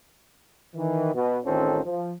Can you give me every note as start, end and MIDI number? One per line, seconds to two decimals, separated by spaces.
0.76 1.14 51
0.76 1.14 52
1.15 1.38 47
1.45 1.80 33
1.45 1.80 51
1.45 1.80 60
1.45 1.80 61
1.45 1.80 65
1.45 1.80 69
1.85 2.13 53